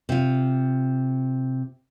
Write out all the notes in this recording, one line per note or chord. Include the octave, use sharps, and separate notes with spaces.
C3 F4